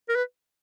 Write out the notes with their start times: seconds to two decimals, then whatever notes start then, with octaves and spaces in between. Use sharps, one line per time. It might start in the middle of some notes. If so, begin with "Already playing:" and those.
0.09 A#4
0.16 B4